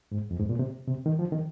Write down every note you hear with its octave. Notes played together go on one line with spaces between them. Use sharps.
G#2
F2
G#2
A#2
C3
C3
D#3
F3
D#3